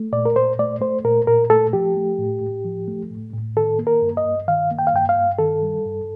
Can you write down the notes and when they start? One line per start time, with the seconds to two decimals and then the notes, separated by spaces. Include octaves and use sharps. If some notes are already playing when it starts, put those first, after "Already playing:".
Already playing: A3
0.13 A#2 D5
0.26 A#4
0.36 A#2 C5
0.59 A3 D5
0.81 A3 C5
1.04 A#2 A#4
1.27 A#2 A#4
1.50 A3 A4
1.73 F3 G4
1.97 A3
2.18 A2
2.42 A2
2.65 F3
2.88 A3
3.10 A2
3.33 A2
3.56 D#3 A4
3.79 A#3
3.87 A#4
4.02 G2
4.17 D#5
4.25 G2
4.48 D#3 F5
4.71 A#3
4.79 G5
4.87 F5
4.93 G2 G5
5.09 F5
5.16 G2
5.39 D#3 A4
5.63 G3
5.85 G2